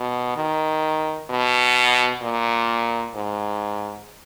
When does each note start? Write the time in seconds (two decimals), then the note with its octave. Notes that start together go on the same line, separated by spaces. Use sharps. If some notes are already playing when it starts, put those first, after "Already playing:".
Already playing: B2
0.36 D#3
1.30 B2
2.22 A#2
3.15 G#2